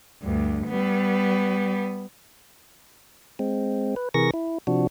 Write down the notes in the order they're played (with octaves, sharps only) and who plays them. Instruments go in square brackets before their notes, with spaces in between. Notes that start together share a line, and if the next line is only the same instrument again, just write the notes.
[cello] D2 G2
G3 B3
[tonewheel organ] G#3 C4
B4
C3 E3 G#4 A#4 C#6 A#6
E4
C3 F3 D4 F#4